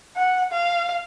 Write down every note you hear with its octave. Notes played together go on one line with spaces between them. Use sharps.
F#5
F5